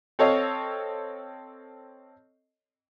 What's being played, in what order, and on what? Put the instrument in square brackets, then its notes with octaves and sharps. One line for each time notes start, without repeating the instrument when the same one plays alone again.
[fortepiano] C4 A4 C#5 D#5 F5